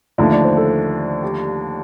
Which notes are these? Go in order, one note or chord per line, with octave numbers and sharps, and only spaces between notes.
D#2 D3 F3 A3 D5
D5
C5
A4
G4